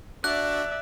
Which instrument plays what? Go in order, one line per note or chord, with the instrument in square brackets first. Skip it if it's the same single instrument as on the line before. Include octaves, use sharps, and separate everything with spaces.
[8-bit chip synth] D4 F#4 [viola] D5 E5 [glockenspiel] F#6